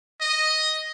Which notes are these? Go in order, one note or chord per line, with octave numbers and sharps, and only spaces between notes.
D#5